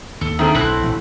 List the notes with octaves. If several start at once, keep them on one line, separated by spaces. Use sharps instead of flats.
D#2 A4
D#3 A3 C4 G#4
B1 A2 C4 E4 F#6
A1 B2 E3